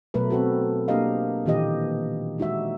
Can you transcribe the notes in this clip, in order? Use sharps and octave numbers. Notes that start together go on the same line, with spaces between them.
B2 F#3 A3 A#4 B4
C4 F#4 A4
A#3 D4 G4 A#4 D#5 F5
A#2 D#3 E3 G4 D#5
G#3 D#4 F#4 E5